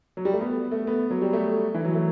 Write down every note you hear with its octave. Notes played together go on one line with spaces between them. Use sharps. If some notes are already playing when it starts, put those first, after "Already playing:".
F#3
G3
A3
B3
A3
B3
F#3
G3
A3
E3
F#3
A3